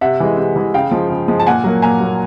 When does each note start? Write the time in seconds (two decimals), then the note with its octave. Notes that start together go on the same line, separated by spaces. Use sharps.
0.01 C3 E5 F#5
0.20 E3 G#3
0.37 C3
0.56 E3 G#3
0.74 C#3 F5 G5
0.91 F3 G#3
1.10 C#3
1.28 F3 G#3
1.40 A5
1.46 A#2 F#5 G#5
1.64 F#3 A#3
1.82 A#2 G#5 A#5
2.00 F#3 A#3